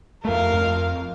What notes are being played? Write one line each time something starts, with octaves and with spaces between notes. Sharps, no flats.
F2 A3 A#4 F5
F2